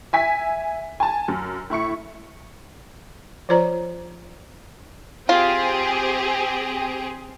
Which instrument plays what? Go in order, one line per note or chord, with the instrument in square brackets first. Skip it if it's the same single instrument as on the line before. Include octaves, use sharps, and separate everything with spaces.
[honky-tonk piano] E5 G#5 B6
G#5 A5
F#2
A2 E4 C#6 C#7
[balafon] F3 F4 C5 D5 A#5
[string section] C4 G4 G#4 [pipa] F4